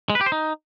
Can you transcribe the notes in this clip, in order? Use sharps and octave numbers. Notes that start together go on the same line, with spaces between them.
G#3
B4
G4
C5
D#4